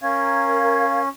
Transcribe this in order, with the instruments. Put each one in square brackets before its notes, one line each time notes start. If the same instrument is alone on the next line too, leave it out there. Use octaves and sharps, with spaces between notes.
[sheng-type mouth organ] C#4 [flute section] A#4 F5 G#6